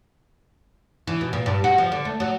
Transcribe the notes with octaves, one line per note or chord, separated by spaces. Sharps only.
E3
B2
A#2
G2
F#4
F3
D3
A3
F#3